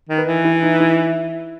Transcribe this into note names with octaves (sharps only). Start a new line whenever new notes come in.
D#3
B4
E3
E4
D#4
E4